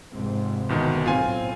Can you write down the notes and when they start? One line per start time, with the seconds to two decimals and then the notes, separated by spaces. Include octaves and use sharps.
0.12 F1 G#2 C4
0.69 G1 B2 D#3
1.06 B1 A2 C4 F4 G#5